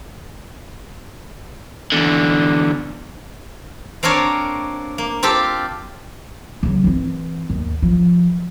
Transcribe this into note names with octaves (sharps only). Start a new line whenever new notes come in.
E2 D3
A#3 C4 D4 A#4 C#5 D5
A#3
C4 F4 G4 A4
C#3 F#3
E3 C4
D#2
F3